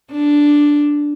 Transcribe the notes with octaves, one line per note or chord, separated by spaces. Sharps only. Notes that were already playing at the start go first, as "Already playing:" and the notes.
D4